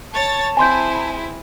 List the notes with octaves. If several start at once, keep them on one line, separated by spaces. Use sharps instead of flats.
C#5 A5 A6
C4 E4 G#4 G#5 C6 G6